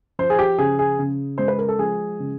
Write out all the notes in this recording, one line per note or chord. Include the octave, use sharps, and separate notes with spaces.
F3 C5
G#4
G4
C#3 G#4
G#4
C#3
G#3 C5
B4
A#4
A4
F3 G#4
C#3